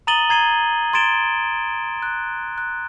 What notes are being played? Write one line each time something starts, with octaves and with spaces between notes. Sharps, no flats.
A#5 D#6 A6 D#7 F#7 G7
A#5 G#6 C7 D#7 G7
C6 G#6 A6 D7 E7 G7
F#6
F#6